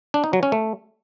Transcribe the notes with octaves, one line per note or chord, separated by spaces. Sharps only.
D4
D#4
F#3
C#4
A3